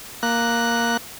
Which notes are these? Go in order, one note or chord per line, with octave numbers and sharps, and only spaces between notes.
A#3 F#6